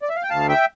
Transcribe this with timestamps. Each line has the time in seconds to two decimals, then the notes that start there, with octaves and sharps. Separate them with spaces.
0.02 D5
0.09 E5
0.16 F5
0.23 G5
0.30 D2 F5 A5
0.49 E5 G5